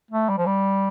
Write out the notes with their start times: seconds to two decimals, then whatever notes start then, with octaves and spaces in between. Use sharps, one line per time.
0.11 A3
0.29 G3
0.38 F3
0.46 G3